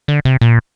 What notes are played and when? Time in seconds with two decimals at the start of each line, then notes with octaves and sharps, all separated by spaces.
0.08 D3
0.25 C3
0.41 A#2